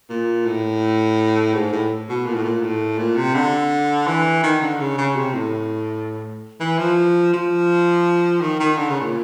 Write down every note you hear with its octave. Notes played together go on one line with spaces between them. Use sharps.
A#2
A2
G#2
A2
B2
A#2
A2
A#2
A2
A#2
C3
D3
E3
D#3
D3
C#3
C#3
C3
A2
E3
F3
F3
D#3
D#3
D3
C#3
A#2